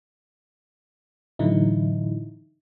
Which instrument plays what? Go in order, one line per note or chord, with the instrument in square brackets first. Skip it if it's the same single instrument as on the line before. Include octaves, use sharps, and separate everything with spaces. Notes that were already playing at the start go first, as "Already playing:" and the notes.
[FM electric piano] A2 D3 E3 F#3 D#4 E4